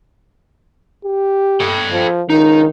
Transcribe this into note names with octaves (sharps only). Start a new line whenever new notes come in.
G4
A4 G5
F3
C#2 D#3 D#4